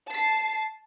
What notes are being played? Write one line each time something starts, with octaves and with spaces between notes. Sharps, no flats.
A5 C7